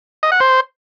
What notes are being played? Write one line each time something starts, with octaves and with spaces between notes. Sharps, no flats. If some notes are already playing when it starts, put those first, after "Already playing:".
D#5
F#5
C5